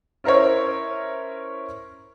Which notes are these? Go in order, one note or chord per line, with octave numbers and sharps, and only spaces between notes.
C#4 E4 A#4 C5 C#5